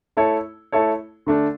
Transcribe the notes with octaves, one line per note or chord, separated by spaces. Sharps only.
A3 E4 A4 C#5
A3 E4 A4 C#5
D3 A3 D4